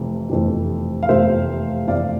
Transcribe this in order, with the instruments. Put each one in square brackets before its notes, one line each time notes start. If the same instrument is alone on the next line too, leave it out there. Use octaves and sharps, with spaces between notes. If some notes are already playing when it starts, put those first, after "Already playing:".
Already playing: [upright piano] F1 F2 E3 A3
F1 F2 E3 A3
F5
F1 F2 E3 A3 C5 E5
F1 F2 E3 A3 D5 F5